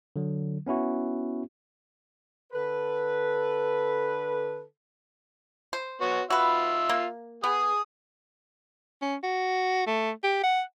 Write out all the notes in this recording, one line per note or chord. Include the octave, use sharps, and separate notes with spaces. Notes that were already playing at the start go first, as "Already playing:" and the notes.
D3 F#3
B3 C#4 E4 F#4
D3 A4 B4
C5
B3 F#4 C#5
F4 F#4 B4 E5
A#3
B3 G#4 D#6
C#4
F#4
A3
G4
F#5